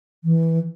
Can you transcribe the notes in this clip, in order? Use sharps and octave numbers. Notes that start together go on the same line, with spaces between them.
E3